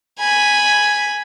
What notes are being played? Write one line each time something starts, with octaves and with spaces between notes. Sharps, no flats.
G#5 B5